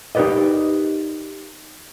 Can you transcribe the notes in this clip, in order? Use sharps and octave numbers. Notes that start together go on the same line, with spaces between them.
D#4 G4 A#4 B4 D5 D#5